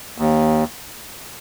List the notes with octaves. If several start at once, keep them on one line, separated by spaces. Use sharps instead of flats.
D#2